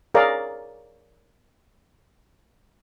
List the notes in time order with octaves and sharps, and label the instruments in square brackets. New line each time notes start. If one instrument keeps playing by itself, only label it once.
[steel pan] G#4 A#4 C#5 D5 F5 A#5